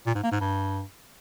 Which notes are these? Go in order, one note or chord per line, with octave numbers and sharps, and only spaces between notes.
A#2
G#2
A#3
G#2
G2